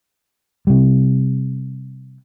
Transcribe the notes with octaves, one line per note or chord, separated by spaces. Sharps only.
C3 G3